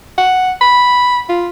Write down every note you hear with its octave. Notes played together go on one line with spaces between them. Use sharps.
F#5
B5
F4